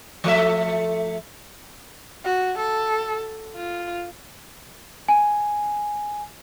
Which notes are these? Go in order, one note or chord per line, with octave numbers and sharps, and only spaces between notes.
F3 A3 E5
F#4
A4
F4
G#5